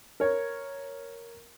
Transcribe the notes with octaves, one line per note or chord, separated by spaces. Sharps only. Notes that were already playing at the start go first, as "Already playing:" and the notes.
A#4 C#5